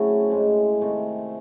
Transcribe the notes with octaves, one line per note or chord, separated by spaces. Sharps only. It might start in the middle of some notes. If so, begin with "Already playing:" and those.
Already playing: C#3 F#3 A3 C4 E4
A2 G#3 C4
C3 D#3 A3 C4